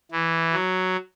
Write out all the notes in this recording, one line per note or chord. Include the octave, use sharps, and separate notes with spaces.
E3
F#3